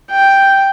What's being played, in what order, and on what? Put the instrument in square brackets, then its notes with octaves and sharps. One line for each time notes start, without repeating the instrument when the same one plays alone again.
[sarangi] G5